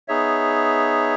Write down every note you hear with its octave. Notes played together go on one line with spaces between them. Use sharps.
B3 D#4 G#4 C#5 E5